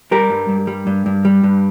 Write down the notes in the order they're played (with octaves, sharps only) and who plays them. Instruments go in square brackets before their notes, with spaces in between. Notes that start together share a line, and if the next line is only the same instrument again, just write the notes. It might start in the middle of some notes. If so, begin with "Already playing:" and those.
[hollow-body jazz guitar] G3 G4 A#4
G2
G2
G3
G2
G2
G3
G2